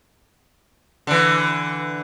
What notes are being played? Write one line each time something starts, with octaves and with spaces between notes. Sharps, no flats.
D3 E3